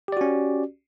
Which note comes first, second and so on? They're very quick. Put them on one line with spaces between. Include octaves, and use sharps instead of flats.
G4 D5 F#4 C#4